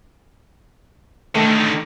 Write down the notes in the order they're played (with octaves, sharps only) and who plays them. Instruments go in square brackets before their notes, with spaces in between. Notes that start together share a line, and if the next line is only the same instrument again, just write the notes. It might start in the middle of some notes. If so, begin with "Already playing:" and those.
[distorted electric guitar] D3 D#3 [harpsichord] A3